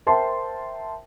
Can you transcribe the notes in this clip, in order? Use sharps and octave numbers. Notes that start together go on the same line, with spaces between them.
A#4 C5 E5 G5 A5 C6